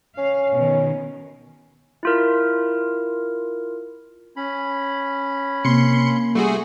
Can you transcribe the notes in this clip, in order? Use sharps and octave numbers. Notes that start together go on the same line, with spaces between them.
C#4 F5
B2 D#3
E4 F4 A#4
C#4 B5
C3 A#3 C6 C#7
G3 A3 F#4 G#4 C6 C#6